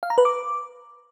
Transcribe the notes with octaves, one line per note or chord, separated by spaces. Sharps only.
F5
A#5
B4
D6